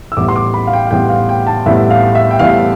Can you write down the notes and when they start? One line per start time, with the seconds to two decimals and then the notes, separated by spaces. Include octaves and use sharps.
0.12 E6
0.17 A1 A2 G3 B3 D6
0.29 C6
0.36 D6
0.54 B5
0.67 F5
0.73 G5
0.87 F5
0.91 A1 A2 G3 B3 G5
1.10 F5
1.29 G5
1.47 A5
1.66 A1 A2 G3 B3 E5
1.91 F5
2.15 E5
2.31 G5
2.39 A1 A2 G3 B3 F5